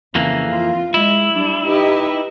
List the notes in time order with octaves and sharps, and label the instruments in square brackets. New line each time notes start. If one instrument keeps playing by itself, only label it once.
[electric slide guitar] F2 E3 A#3 [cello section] C#3
[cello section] F4
[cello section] G#3 [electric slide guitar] E4
[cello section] G3 D4
D#4 G4 B4